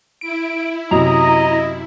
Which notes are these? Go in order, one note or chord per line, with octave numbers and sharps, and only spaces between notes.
E4 D7
F#2 C3 D#5 A#5